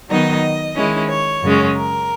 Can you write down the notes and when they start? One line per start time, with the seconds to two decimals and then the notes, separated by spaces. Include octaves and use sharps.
0.10 D#3 F#3 B3 D#4 D#5
0.77 D#3 G#3 C#4 E4
1.10 C#5
1.42 F#2 C#3 G#3 C#4
1.76 A#4